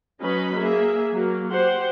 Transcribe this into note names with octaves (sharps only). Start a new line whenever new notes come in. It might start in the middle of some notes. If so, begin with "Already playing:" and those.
F#3 C#4 B4 D#5 B5
A#3 G#4 E5
F#3 A#3
G4 C5 F#5